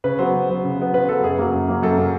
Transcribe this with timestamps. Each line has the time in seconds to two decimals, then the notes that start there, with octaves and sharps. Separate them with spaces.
0.04 C#3 B4
0.19 F#3 B3 C5
0.34 C#3
0.49 F#3 B3
0.64 C#3
0.78 F#3 B3
0.94 C#3 B4
1.08 F#3 B3 A4
1.23 F#2 G#4
1.39 C#3 F#3 A#3
1.54 F#2
1.68 C#3 F#3 A#3
1.83 F#2 A4
1.98 C#3 F#3 A#3